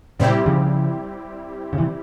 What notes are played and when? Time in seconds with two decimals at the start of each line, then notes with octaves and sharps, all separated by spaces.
0.20 A#2 C#3 G3 C4 E4 G4
0.46 C#3 F3
1.73 C#3
1.78 C3 E3